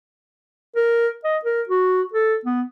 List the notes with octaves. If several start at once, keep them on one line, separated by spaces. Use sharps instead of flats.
A#4
D#5
A#4
F#4
A4
B3